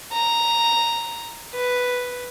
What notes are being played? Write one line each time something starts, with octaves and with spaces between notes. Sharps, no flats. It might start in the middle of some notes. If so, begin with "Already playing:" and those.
A#5
B4